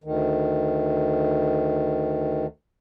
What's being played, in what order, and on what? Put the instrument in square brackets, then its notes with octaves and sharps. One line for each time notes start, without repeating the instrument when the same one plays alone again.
[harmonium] D2 D#3